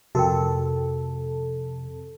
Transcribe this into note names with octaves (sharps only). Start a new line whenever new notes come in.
F2 C3 F#4 A4 A#4 G5